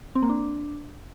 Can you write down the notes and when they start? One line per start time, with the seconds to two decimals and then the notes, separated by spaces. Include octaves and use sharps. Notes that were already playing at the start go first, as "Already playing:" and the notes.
0.15 C4
0.22 A#3
0.29 D4